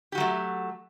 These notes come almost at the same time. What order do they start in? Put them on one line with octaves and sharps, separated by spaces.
G4 F#4 F#3 A3